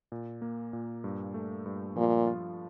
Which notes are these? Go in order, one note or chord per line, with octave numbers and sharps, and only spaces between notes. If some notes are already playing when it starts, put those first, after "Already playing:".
A#2
A#3
A#2
G2
A3
G2
A#2 F3
F4